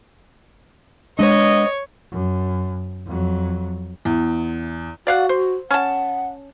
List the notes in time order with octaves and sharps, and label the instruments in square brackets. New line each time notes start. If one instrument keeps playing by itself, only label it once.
[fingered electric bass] G#3 D4 [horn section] B3 D#5 [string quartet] C#5
[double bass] F#2
F2 F#3
[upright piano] E2
[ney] F#4 [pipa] D5 F5 F#5
[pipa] C5
[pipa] C#4 A5 [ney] F#5